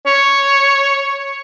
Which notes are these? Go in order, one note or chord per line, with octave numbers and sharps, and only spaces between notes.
C#5